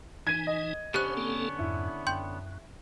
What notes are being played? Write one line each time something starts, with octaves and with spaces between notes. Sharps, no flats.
E3 D#4 G#5 G#6 D#7
D#5
D3 B3 C#4 G4 C5 F#6
A#3 C4 A4
F2 G#2 E4
F#2 G5 C6 G6